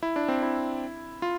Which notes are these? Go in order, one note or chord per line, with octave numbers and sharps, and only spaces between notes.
E4
D4
C4
E4
F4